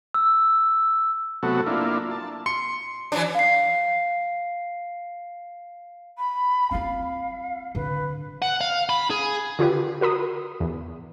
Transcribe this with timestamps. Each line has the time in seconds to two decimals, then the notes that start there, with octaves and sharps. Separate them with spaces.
0.14 E6
1.43 C3 F#3 A3 B3 F#4 A4
1.67 A#3 D4 E4 F4
2.11 A5
2.46 C6 C#7
3.12 E3 F#3 D4
3.35 F5 C7
6.16 B5
6.71 C4 F4 F5
7.75 D3 B4
8.42 F#5
8.61 F5
8.89 B5
9.10 G#4
9.59 D3 F4 G4 B4
10.01 F#4 A#4 B5 D#6
10.60 E2